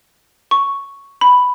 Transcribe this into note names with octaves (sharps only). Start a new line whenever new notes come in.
C#6
B5